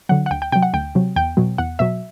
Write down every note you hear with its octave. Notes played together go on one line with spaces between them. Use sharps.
D3 F#3 F#5
F#5
D2 G5
G5
C3 F#3 G5
F#5
D2 G5
C3 F#3
E2 G5
B2 F#3
E2 F#5
B2 F#3 E5